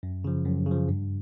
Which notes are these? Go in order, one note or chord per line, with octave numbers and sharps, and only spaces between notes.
F#2
C#3 F3
F#2
C#3 F3
G2